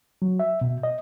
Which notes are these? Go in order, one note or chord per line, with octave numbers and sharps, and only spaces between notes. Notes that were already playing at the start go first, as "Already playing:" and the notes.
F#3
E5
B2
D#5